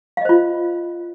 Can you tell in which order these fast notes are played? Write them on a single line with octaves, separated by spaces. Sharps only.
F5 D#5 C5 F4